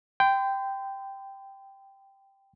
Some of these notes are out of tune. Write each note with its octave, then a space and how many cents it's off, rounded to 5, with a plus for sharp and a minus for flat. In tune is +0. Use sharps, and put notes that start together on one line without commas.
G5 +0 C6 -40